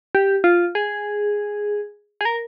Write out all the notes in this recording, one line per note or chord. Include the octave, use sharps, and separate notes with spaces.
G4
F4
G#4
G#4
A#4